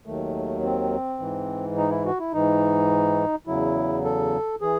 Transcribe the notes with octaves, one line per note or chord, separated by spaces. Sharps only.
D#2 D#3 F#3 A3
C4
G#2 E3
D#4
E4
F#4
E4
G#2 E3 D#4
E2 C#3 F#3 E4
A4
E3 G#4